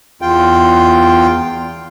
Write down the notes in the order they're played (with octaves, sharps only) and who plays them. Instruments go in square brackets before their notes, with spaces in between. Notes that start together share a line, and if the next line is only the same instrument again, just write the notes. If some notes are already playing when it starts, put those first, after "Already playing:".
[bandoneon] E2 F4 G5